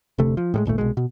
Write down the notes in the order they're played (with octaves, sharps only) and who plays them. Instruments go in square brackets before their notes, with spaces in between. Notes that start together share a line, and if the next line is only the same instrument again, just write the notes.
[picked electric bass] F1 D2 C3 A3
F3
A2 G3 G#3
D#1 G#1 A#2 A3
C2 B2 G#3
B2